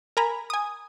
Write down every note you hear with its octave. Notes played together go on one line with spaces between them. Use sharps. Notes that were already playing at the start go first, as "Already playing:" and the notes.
A#4 G#5 A#5 B5
G#5 D#6